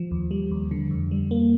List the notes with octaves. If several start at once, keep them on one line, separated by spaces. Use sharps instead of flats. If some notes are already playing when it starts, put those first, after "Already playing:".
Already playing: F3
D#2
G3
D#2
D3
F2
G3
A#3